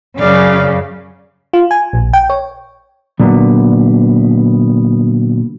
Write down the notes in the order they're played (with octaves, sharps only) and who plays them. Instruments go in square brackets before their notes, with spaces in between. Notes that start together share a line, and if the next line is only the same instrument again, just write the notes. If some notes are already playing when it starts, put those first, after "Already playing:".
[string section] F#2 C#3 [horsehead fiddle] D5 F5
[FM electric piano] F4
G#5
A#1
G5
C#5
[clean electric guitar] A#2 D3 F#3 B3